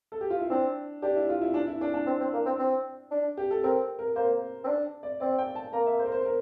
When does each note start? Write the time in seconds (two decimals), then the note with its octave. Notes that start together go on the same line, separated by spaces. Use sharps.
0.12 A4
0.21 G4
0.30 F4
0.40 E4
0.50 C4 D4
1.02 D4 G4
1.16 E4
1.29 F4
1.42 E4
1.54 D4
1.67 E4
1.81 D4
1.94 D4
2.07 C4
2.20 C4
2.33 A#3
2.45 C4
2.59 C4
3.11 D4
3.37 G4
3.51 A4
3.64 C4 A#4
3.99 A#4
4.16 A#3 C5
4.64 C4
4.68 D4
5.03 D5
5.20 C4 D5
5.38 G5
5.55 A5
5.73 A#3 A#5
5.86 E5
5.99 C5
6.06 A#4
6.12 C5
6.25 A#4